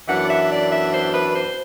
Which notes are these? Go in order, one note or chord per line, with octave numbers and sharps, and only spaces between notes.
F#2 E3 B3 D4 F#5
D5
E5
D5
E5
C5
B4
C5